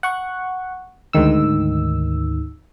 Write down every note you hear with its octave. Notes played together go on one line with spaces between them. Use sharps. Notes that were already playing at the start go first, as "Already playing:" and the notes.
F#5 C#6
D2 G#2 D#3 E6